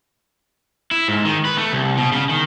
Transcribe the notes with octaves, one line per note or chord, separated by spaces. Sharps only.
E4
G#2
D#3
B4
A3
C2
B2
C#3
D#3